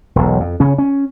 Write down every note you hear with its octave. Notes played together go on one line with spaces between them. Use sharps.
E1 B1
F2
C#3 C#4
C#4